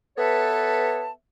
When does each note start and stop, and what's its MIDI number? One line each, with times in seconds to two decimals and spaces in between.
0.18 1.10 59
0.18 1.10 69
0.18 1.10 71
0.18 1.10 73
0.18 1.10 76
0.18 1.10 81